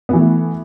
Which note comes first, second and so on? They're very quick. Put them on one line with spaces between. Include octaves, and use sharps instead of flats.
B3 E3 A3